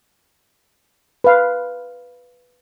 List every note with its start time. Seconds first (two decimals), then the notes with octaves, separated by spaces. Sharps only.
1.24 B4 F5